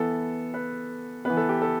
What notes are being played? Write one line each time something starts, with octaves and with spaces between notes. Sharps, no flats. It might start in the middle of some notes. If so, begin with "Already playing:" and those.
Already playing: E3 B3 A4
B4
E3 B3 B4
A4
G4
A4